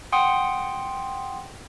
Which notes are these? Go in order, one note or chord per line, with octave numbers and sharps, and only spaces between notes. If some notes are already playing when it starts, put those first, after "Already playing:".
F#5 G5 C6 D#6